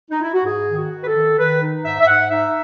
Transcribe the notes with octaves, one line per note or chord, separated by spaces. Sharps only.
D#4
E4
F#4
G#2 G#4
D#3
F#4
D#3
B4
A4
D#3
D#3 B4
D#4
G#2 E5
E5
G#2 F#5
D#4 E5